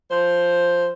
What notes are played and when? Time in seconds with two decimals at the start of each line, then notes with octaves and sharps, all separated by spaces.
0.10 F3 C5